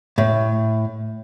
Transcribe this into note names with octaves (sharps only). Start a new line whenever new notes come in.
A2